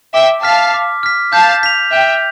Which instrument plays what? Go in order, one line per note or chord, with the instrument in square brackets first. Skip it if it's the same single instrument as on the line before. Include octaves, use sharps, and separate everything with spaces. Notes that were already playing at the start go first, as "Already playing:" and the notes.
[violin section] E5 G5 [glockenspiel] D6
[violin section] F5 A5 [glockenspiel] F6 B6
[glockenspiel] D6
F6 B6
[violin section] F5 A5 [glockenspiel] G6
[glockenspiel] B6 F7
[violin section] E5 G5 [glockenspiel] G6